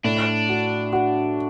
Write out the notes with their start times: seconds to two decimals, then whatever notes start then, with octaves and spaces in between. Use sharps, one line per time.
0.04 A2 D4
0.49 F#4
0.93 F#4